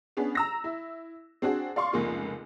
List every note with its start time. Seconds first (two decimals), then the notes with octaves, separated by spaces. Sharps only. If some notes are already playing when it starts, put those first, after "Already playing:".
0.17 B3 C#4 D4 G#4
0.35 A#5 E6 A#6
0.64 E4
1.42 C4 D4 F#4 G#4
1.76 D5 F5 C6 C#6
1.93 F1 C#2 A#3 F4